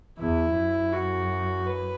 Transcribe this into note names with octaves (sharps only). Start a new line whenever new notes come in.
E2 E4
F#2
F#4
B4